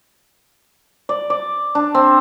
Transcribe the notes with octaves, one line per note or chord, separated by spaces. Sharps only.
D5
D5
D4
C4